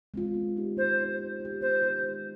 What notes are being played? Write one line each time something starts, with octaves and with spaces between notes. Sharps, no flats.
G#3 C4 F4
B3
D#4 G4
B3 C5
D#4 G4
B3
D#4
G4
B3 C5
D#4 G4
G#3